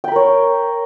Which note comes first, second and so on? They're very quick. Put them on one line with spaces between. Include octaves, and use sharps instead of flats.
G5 B5 A#4 C#5